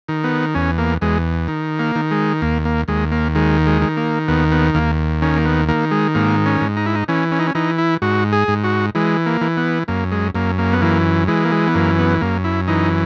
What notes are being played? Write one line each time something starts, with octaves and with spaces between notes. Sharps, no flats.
D#3
B3
E2 C#4
A#3
E2 G#3
D#3
A#3
D#3
G#3
D#2 A#3
A#3
D#2 G#3
A#3
D#3 G#3
G#3
D#3
A#3
D#2 B3
B3
D#2 A#3
D#3 C#4
A#3
B3
D#3 A#3
G#3
G#2 A#3
C#4
G#2
D#4
E4
D#4
E3 C#4
C#4
D#4
C#4
E3 D#4
E4
G#2 F#4
G#4
G#2
F#4
E3 G#3
A#3
E3
B3
F#2 A#3
G#3
F#2 A#3
A#3
B3
E3 A#3
E3 G#3
A#3
G#3
B3
F#2 A#3
B3
F#2 A#3
E4
E3 D#4